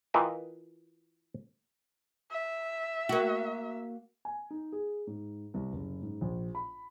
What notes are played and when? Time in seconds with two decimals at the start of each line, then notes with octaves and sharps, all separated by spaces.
0.14 E3 F4 A#4 D#5 E5 G5
2.31 E5
3.09 A#3 F#4
4.25 G#5
4.50 D#4
4.72 G#4
5.07 G#2
5.54 C2
5.73 F#1
6.02 G#2
6.21 A#1
6.55 B5